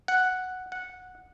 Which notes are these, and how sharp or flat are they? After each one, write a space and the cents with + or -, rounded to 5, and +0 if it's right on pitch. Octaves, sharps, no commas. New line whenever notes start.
F#5 +0
F#5 -10